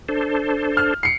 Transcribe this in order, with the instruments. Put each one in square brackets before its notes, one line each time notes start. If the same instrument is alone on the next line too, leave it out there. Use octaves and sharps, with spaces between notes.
[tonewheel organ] D4 A4 C5
[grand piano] F6
C7 C#7